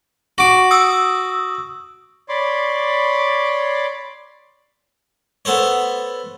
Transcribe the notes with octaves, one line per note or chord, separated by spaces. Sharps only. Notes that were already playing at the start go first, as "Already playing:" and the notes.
F#4 D6
D#6 E6
C#5 D5 B5 C6 D6
B3 A4 C5 C#5